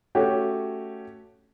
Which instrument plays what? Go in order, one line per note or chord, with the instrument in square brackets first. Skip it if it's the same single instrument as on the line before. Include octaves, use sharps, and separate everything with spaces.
[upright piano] A3 C#4 F#4 G4